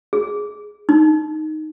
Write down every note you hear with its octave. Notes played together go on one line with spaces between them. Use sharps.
G#4
D#4